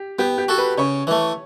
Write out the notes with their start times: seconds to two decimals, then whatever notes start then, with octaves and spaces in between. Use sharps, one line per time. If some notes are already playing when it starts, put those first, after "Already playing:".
Already playing: G4
0.19 B3 G4
0.38 G4
0.48 F#4 A4
0.58 B4
0.78 C#3 C#5
1.07 E3 A3